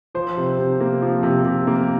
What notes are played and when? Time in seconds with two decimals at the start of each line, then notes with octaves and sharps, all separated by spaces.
0.15 F3 C5
0.37 C3
0.58 C3
0.80 A#3
1.02 F3
1.23 C3
1.45 C3
1.67 A#3